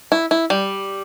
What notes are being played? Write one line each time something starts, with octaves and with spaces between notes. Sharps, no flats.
E4
E4
G3